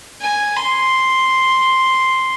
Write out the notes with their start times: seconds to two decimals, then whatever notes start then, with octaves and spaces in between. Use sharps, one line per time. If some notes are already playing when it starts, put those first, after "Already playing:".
0.21 G#5
0.56 C6